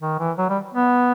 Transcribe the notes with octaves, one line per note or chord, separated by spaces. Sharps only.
D#3
E3
F#3
G3
B3